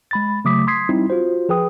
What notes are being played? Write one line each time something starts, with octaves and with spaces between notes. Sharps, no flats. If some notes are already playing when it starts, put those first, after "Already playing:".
G#3 B5 A6
C#3 F#3 A3 D6 D#6 B6
C6 D#6 G#6 B6 C7
G3 C4 D#4 E4
F4 F#4 C5
F3 G#4 B4 G5 D#6